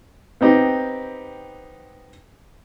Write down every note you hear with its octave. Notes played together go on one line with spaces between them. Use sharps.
B3 C4 D#4 G4